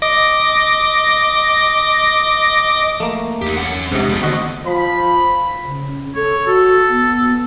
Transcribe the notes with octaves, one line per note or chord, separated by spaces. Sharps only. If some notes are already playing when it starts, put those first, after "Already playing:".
D#5 D6 A#6
F3 A3 A#3
E2 D#4 G4
C#4 F#5
F1 G#2 C3 D4 D#4
F3 B3
D3 D#3 A3 F#4 D#5
F3 B5
C#3
A4 C#5
F#4 A4
B3